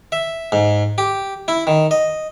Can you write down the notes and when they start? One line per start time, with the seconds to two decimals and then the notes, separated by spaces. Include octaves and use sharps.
0.12 E5
0.52 G#2
0.98 G4
1.48 E4
1.67 D#3
1.91 D#5